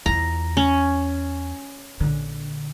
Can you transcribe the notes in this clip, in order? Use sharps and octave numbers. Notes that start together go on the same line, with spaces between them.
E2 F4 A#5
C#4
A#1 D3